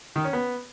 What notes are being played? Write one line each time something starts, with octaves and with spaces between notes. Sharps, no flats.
D#3
C#4
B3